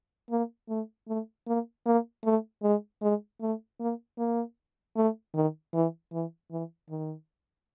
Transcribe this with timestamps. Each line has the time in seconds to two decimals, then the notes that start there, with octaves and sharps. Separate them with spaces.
0.30 A#3
0.69 A3
1.08 A3
1.47 A#3
1.86 A#3
2.24 A3
2.63 G#3
3.02 G#3
3.41 A3
3.80 A#3
4.18 A#3
4.96 A3
5.34 D#3
5.74 E3
6.12 E3
6.51 E3
6.90 D#3